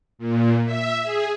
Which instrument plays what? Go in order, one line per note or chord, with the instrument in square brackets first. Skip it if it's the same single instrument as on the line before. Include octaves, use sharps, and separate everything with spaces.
[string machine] A#2
E5
G#4